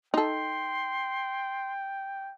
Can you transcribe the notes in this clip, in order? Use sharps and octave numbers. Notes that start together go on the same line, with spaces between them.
D#4 A4 G5 C6